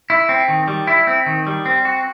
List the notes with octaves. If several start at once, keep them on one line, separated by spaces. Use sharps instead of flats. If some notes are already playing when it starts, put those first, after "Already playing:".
E4
C4
D#3
G3
E4
C4
D#3
G3
C4
F#4